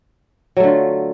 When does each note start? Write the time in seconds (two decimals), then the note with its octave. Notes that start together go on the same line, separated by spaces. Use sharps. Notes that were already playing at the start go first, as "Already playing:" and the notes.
0.57 F#3
0.60 A3
0.64 D3
0.67 F4